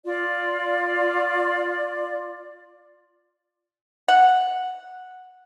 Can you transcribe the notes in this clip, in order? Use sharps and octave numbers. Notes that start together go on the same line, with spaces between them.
F4 D5
F#5